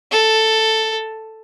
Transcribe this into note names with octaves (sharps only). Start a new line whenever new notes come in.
A4